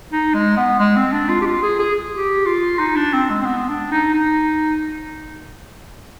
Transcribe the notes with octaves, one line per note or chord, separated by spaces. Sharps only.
D#4
G#3
B3
G#3
C4
D4
F4
G4
F4
G#4
G#4
G4
F4
D#4
D4
C4
G#3
C4
B3
D4
D#4
D#4